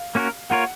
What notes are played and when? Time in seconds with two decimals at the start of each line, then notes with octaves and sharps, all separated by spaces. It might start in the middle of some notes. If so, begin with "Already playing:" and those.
Already playing: F5
0.15 A#3 C#4 F#4 A#4
0.50 A#3 F4 A#4 C#5 F#5